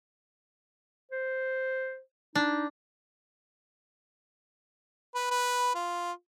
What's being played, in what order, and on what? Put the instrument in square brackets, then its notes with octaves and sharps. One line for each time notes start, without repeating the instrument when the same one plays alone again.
[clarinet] C5
[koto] D4 [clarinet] D#4
[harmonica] B4
B4
F4